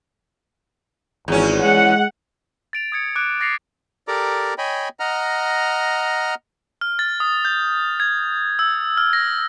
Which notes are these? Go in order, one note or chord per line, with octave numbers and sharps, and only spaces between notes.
G#1 E2 C#4
G#3 F#5
A6 D7 F7
D#6 G#6 C#7 D7
D6 F#6 D7
D6 A6 A#6 C7 C#7 F7
G4 A4 A#4 D5 A#5 D6
C#5 D#5 G5 G#5 B5
D#5 F#5 A#5 F6
F6
A6
D#6
G6
G#6
E6
F6
A#6